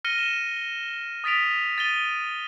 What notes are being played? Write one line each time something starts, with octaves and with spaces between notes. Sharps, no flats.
F6 A#6 C#7 D#7 G7
E7
D#6 A6 B6 D7 F7
A6 D#7 G7